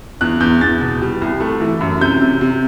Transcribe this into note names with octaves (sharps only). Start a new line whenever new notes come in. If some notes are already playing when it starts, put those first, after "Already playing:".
E2 F#6
E2 G6
E2 A6
B2
G3
C2
A3
E3
F#2
C3 G6
C3
C3